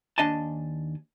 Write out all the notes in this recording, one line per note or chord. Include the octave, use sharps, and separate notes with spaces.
D#2 D4 D#5 G#5 A5